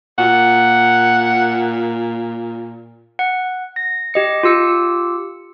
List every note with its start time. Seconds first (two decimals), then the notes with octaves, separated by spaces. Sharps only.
0.18 A#2 F#5
3.19 F#5
3.76 A#6
4.14 G4 D#5 C#7
4.43 F4 G4 E6 C#7